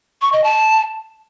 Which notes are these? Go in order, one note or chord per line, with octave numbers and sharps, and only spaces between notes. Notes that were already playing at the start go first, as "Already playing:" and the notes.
C#6
D#5
A5